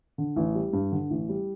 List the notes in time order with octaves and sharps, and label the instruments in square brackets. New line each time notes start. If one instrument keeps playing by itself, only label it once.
[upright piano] D3
A1
G3
G2
D3
A1
G3